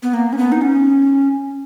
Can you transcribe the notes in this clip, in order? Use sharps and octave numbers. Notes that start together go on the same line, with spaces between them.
B3
A#3
C#4
B3
D#4
C#4